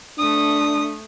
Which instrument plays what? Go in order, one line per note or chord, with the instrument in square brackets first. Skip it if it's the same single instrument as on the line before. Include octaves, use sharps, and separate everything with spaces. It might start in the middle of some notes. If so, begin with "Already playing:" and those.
[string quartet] A3 D#6 [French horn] D4